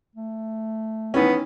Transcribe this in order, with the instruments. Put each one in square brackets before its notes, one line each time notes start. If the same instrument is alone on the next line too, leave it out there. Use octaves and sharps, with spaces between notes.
[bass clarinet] A3
[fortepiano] D#3 E3 C#4 [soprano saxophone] B3